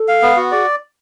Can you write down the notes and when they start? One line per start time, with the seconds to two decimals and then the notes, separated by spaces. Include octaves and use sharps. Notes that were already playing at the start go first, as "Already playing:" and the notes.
Already playing: A4
0.08 F5
0.22 B3
0.37 F#4
0.51 G#4 D5